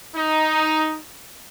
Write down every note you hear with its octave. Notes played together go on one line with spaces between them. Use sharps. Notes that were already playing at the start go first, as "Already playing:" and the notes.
D#4